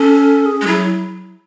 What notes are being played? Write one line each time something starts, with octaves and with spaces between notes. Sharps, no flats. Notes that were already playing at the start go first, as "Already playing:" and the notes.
Already playing: C#4 A4
G#4
G#3
F#3 E4